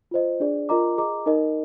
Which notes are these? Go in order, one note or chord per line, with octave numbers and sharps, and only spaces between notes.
F4 C5 D#5
D4 G#4 D5
F4 A#4 D#5 A#5 D6
G#4 D#5 A#5 D6
D#4 A#4 D#5